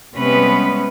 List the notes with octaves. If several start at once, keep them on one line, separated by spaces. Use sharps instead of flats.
C3 G3 G#3 B3 C#4 B4